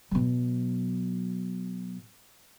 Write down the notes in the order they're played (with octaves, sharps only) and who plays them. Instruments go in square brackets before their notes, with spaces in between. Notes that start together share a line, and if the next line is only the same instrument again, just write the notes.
[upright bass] B2 F#3